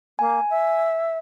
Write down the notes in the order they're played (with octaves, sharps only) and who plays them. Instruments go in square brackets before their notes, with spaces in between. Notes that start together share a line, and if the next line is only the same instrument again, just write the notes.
[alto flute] A#3 [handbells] G#5
[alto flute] E5